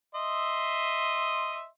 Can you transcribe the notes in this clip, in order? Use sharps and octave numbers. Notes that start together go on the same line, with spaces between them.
D#5 E5 C6